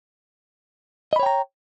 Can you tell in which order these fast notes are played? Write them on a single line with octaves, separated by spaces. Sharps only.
D#5 B5 C#5 G5 A#5